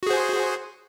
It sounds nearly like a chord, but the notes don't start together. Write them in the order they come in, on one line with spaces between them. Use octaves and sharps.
F#4 G#4 C5